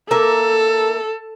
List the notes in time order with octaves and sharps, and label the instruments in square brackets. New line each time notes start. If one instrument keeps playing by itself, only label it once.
[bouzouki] A#3 E5 [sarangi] A4